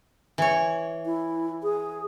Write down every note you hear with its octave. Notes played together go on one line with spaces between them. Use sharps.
E3 C#5
E4
G#4